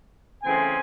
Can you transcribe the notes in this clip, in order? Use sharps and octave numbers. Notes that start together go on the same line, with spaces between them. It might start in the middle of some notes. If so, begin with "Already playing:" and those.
C#3 E3 A3 C4 G#5